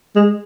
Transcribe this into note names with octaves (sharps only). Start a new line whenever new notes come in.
G#3